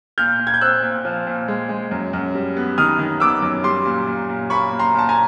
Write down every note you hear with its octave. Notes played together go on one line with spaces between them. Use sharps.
A#2 F6 G6
A#2
G#6
G6
C4 E6 F#6
A#2
F3
A#2
G#3
G#3
F#2
F#2
G3
B3
D#3 D#6 F6
D#3
B3 D6 E6
F#2
G3 C6 D6
A#2
A#2
A#2
A#3 B5 C#6
A#2
A#5 C6
A#2 A5
G#5 A#5